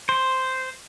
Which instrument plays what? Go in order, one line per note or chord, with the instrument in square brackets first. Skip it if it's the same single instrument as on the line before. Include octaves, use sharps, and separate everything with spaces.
[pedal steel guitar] C5